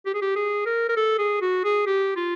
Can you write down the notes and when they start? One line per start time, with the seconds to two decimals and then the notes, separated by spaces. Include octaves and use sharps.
0.06 G4
0.14 G#4
0.22 G4
0.36 G#4
0.66 A#4
0.89 A#4
0.96 A4
1.19 G#4
1.41 F#4
1.64 G#4
1.86 G4
2.17 F4